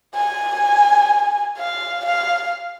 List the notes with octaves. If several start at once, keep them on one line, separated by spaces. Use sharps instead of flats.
G#5
F5
F5